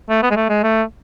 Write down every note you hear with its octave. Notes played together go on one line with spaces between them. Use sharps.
A3
B3
G#3
A3
G#3
A3